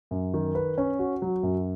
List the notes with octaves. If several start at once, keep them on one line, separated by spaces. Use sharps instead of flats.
F#2
D#3
B4
C#4
F#4
F#3
F#2